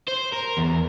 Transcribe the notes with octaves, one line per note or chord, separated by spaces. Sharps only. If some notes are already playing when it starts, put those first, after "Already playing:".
C5
A#4
E2